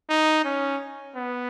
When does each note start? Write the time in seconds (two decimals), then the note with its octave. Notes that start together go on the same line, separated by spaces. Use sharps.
0.10 D#4
0.45 C#4
1.16 B3